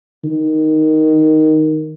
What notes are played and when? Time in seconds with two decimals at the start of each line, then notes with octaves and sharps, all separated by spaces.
0.24 D#3